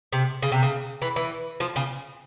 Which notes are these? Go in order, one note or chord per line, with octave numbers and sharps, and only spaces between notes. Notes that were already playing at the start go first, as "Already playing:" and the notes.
C3
C#3
C3
C#3
E3
E3
F3
C#3